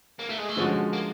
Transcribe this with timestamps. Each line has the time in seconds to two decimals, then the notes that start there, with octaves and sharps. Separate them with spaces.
0.20 A#3
0.30 A3
0.39 G#3
0.49 A3
0.57 D3 F3 G#3 C#4 F#4
0.93 A#3